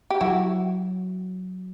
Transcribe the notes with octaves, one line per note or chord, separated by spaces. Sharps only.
G4
F#3 E4 F#4